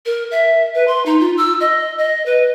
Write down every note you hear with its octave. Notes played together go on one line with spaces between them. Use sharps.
A#4
E5
B4
C6
D#4
F4
E6
D#5
D#5
B4